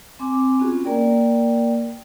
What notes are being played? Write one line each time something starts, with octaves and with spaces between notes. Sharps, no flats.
C4 G#5 D6
B3 C#4 F4 F#4 G#4
A#3 A#4 D5 G5